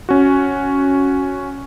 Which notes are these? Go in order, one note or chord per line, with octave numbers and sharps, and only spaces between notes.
C#4 F#4